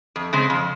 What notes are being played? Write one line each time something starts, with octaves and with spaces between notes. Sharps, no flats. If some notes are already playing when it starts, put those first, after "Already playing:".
F2
C#3 G#3 C4
F2